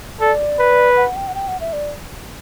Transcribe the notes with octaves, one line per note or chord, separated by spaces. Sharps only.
A4 D5
B4
F#5
G5
F#5
G5
F#5
E5
D5